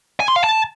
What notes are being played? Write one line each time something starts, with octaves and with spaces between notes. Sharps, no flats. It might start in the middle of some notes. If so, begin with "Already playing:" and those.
G#5
C6
F5
A5